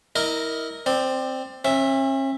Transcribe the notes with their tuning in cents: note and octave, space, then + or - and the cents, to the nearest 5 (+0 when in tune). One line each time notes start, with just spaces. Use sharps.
E4 -30 A#4 +0 D#5 -15
C4 +0 D5 +25
C#4 -45 E5 +0